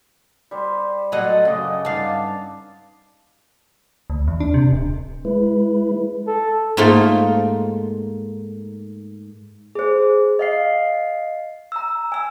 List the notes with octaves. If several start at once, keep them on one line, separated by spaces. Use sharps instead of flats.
G3 C5
A2 F#3 A4 D#5 E5 F#5
F#2 C#3 D#5 D6
G2 D#4 D5 F5 A5
D2
E2
D4
C3
D1
G#3 E4 B4
A4
G#2 A3 A#3 D#4 F4
G#4 C5
D#5 F5 C7
A#5 E6
G#5 E6